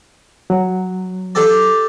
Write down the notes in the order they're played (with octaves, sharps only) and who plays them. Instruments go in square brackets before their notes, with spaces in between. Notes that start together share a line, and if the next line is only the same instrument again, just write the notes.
[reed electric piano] F#3
[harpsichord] G4 A4 D5